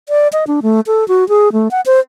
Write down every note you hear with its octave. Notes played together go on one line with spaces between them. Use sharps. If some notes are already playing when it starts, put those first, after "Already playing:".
D5
D#5
D4
A3
A4
F#4
G#4
A3
F#5
C5